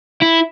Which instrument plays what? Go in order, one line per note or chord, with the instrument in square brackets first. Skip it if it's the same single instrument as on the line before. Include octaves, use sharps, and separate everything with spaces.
[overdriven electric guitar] E4